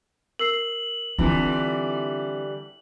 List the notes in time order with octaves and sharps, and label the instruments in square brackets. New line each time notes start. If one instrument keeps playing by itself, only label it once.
[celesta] A#4 E6 C7 [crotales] F#7
[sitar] D3 E3 G3 [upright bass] C4 [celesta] E4 F4